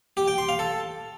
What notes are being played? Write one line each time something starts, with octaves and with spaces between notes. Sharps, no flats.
G4
G5
C6
F5
A4